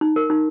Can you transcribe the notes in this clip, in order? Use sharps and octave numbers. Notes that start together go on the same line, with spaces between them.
D#4
A#4
D#4